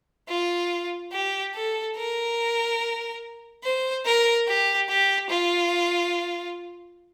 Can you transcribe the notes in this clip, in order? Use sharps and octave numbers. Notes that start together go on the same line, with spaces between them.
F4
G4
A4
A#4
C5
A#4
G4
G4
F4